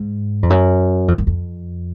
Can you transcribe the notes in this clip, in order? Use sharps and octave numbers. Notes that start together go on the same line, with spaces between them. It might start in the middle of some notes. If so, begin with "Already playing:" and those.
Already playing: G#2
F2
F#2
F2
F#2
F2